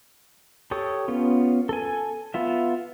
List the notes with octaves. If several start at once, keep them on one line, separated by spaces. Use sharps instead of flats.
G4 A4 C#5 D#6
B3 C#4 F4
A4 G#5
B3 F4 E5